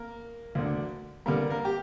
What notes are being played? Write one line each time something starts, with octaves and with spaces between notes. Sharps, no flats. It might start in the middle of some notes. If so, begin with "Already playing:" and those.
Already playing: A#3 A#4
D2 D3
G2 D3 A#3 A#4
A#3 A#4
G4